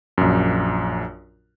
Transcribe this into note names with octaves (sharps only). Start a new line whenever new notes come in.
A#1 F#2